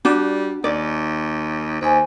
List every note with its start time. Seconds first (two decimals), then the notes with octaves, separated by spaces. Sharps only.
0.05 G3 D4 F#4
0.64 D#2 D5
1.81 D#2 C5 G#5